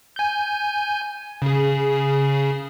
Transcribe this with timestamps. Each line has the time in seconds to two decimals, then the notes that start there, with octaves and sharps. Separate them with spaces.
0.16 G#5 G6
1.42 C#3 G#4